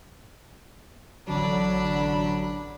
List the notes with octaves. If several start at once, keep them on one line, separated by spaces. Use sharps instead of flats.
A1 D3 F#3 D4 B5